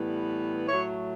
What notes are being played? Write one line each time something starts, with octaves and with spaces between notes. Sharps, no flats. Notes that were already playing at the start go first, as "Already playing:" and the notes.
Already playing: A2 E3 G3 B3
A2 F#3 A3 C#5